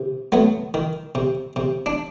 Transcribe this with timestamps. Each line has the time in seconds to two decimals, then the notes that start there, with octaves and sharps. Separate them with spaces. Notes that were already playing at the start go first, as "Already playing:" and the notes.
Already playing: C3
0.32 F#3 A3 B3
0.74 D#3
1.15 C3
1.56 C3
1.86 D4